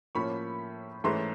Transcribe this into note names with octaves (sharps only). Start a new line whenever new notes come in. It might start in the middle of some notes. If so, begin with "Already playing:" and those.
A2 F3 A#3 C#4 B5 C#6
G#2 E3 A3 C#4 A#5 C6